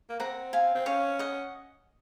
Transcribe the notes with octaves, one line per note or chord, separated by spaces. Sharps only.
A#3
C4 F#5 A#5
F5 G#5
C4
C#4 C#5 F5
D#5 F#5